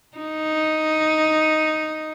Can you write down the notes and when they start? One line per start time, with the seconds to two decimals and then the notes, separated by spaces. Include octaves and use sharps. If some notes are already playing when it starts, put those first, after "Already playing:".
0.17 D#4